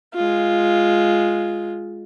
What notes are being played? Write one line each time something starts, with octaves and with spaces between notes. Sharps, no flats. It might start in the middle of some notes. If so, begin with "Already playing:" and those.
G#3 F4